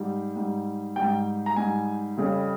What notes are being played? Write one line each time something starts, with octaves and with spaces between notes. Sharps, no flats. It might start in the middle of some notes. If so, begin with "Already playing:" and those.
Already playing: G#2 G3
G#2 G3
G3 G5
G#2
A#5
G#2 G3 G#5
F2 C#3 G3